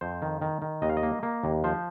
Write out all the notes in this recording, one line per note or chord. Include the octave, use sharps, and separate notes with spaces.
F2 C5
D#3
D#3
D#3
D#2 D#5
F5
D#5
A#3
A#3
D#2
F3 C5